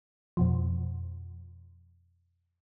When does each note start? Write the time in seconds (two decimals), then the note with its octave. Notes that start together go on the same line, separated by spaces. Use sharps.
0.37 F2 B2 F3